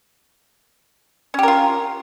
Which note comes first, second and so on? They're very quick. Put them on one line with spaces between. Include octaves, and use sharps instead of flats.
C#4 G4 A#4 F4